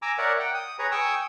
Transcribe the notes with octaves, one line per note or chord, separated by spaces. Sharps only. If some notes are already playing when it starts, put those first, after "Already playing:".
G#5 A#5 D6 E6
A#4 C#5 D5 E5 F#5
F#5 G5
D#6
G#4 B4 C#5 A#5
G5 G#5 C#6 D#6 E6